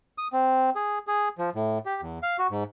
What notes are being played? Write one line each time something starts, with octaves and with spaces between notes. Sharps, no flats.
D#6
C4
G#4
G#4
F3
A2
G4
E2
F5
F#4
G#2